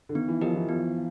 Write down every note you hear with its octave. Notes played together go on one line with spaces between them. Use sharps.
D3
D#3 B3
E3
F3 D#4 G4 A#4 D#5
E3
F3 B3